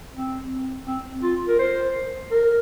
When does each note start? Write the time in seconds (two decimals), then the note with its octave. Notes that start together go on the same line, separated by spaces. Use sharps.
0.15 C4
0.87 C4
1.23 F4
1.48 A#4
1.59 C5
2.31 A#4